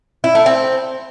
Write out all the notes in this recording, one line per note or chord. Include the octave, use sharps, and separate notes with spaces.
E4
A3
C4